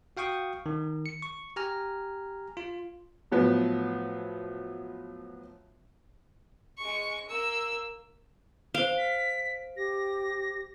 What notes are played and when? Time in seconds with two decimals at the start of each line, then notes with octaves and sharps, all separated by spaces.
0.17 F#4 F5 G5 C#6 D#6
0.66 D#3
1.06 C#7
1.22 C#6
1.56 G4 G#5 A#5 F6
2.57 F4
3.32 A2 F3 F#3 B3
6.78 G#3 C#6
7.29 A#3 E6
8.74 C5 F5 D7 G7
8.97 B6
9.77 G4 A#6